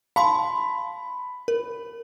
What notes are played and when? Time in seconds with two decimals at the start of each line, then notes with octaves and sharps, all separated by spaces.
0.16 F5 A5 B5 C6
1.48 A#4